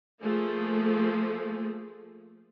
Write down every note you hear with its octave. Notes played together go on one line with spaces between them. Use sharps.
F3 A3 A#3 G#4